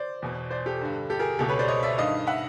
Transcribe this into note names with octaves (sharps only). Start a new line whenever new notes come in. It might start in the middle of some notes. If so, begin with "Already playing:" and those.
Already playing: C5 D5
E2 B2
C5 D5
G4 A4
G2 D3
G4 A4
G#4 A#4
C#2 B2 G4 A4
B4 C#5
C5 D5
C#5 D#5
D5 E5
G2 D#3 D#5 F5
E5 F#5